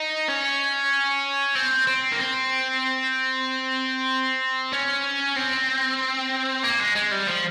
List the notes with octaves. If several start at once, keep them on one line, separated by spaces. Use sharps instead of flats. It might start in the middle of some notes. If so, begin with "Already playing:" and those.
Already playing: D#4
C#4
C4
C4
A#3
C4
C#4
C4
A#3
G#3
G#3
G3
F3